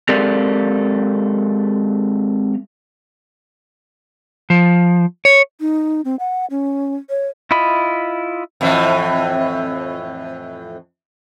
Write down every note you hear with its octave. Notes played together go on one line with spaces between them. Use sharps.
G#3 C4 G4 A4 A#4 D5
F3
C#5
D#4
C4
F#5
C#4
C#5
E4 F4 D#5 B5
F2 A2 E3